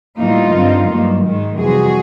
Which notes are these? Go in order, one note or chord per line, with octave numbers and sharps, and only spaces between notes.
A2 E3 G3 A#3 D#4 F4
G2 D3 G3 C4
G2 D#3 F#3 A#3
G#2 D#3 G#3
F2 C3 E3 G3 F#4 G#4